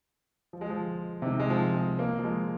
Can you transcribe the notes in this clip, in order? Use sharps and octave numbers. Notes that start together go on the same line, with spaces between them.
F3
G#3
F3
C3
D#3
G#3
F3
G#3
A#3
F3
G#3